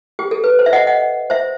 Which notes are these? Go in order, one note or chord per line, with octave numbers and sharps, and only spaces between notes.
G4
A4
B4
C5
E5
D#5 F#5
D#5 F#5
C5 E5